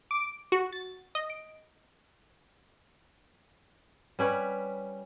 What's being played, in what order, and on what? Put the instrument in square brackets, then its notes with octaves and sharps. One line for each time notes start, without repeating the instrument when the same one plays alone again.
[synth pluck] D6
F#4
A6
D#5
D7
[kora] G3 C#4 B4 C#5